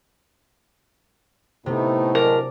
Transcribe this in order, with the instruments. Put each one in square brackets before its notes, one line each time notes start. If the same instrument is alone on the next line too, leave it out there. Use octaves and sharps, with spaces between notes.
[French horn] A2 [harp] C3 [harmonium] A3 B3 D#4
[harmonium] F#3 G#3 D4 [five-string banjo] A#4 [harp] D5